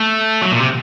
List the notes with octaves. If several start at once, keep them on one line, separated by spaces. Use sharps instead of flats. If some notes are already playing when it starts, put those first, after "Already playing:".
Already playing: A3
F#3
A#2
C3